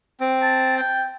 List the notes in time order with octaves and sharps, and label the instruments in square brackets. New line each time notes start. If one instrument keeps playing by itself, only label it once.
[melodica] C4
[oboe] A5
G5